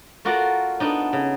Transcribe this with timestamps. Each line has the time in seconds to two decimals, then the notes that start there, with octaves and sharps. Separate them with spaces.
0.25 A3 F4 F#4 A#4 D5 F#5
0.80 B3 D4 D#4
1.13 C#3